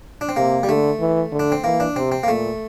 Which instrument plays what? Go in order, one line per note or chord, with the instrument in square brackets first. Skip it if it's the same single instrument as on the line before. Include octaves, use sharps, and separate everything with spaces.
[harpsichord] D4
C4
[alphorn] C3 [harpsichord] A#3
[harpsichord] G3
[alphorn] D3 [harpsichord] A3
[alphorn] E3
D3
[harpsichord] D4
C4
[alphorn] E3 [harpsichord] A#3
[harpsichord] D4
[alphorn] C3 [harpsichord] C4
[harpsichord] C4
A#3
[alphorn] A#2 [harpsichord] A3